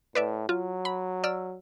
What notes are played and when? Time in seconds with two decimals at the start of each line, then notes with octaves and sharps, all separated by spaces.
0.15 A2 B4 D5 E5
0.49 F#3 F4
0.85 B5
1.24 D5 E6 F6